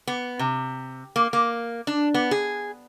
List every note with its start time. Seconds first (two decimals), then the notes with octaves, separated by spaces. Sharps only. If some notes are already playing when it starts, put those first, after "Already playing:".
0.07 B3
0.39 C3
1.16 A#3
1.33 A#3
1.87 D4
2.14 B3
2.31 G#4